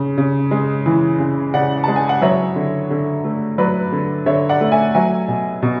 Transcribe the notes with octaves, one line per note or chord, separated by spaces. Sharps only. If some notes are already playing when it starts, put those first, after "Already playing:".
Already playing: C#3
C#3
G#3
E3
C#3
C#3 D5 F#5
G#3 A5
G#5
F#5
F#3 C#5 E5
D3
D3
A3
F#3 B4 D5
D3
D3 C#5 E5
D5 F#5
A3
E5 G#5
F#3 E5 G#5
B2
B2